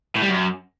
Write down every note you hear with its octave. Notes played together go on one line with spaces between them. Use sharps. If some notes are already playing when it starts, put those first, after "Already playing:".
A2
G3
F#2